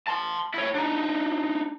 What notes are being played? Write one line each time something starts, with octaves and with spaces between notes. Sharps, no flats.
A5 C6
E4 C#5
D4 D#4